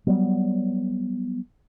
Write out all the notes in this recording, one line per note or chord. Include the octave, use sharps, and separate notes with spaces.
F#3 G3 B3